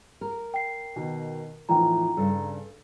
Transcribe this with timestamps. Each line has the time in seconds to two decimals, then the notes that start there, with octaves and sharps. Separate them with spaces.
0.21 A#4
0.54 G5 C7
0.96 B2 D#3
1.69 E2 A2 F3 D#4 G5 A#5
2.17 G2 C#3 A4